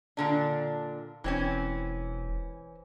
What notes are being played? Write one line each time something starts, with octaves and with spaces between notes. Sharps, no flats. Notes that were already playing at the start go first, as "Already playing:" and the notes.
A#2 D3 D4
E1 E3 C4 C#4